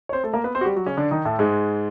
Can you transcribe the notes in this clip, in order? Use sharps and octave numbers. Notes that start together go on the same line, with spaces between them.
C#5
C4 C5
A3 A4
A#3 A#4
B3 B4
C4 C5
F#4
G3 G4
F#3 F#4
C#3 C#4
D3 D4
D#3 D#4
A2 A3
G#2 G#3